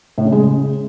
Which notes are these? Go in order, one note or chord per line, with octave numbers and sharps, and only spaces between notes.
A2
C#3
G#3
C#3